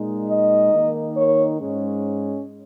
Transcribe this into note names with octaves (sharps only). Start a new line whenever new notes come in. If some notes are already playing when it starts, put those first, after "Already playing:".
Already playing: A#2 G#3 D#4
D#5
D#3 A#3 D#4
C#5
G#2 G#3 C#4